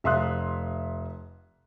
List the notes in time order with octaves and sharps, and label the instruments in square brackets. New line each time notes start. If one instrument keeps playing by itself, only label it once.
[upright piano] F1 E5 F5 C6 D#6 F#6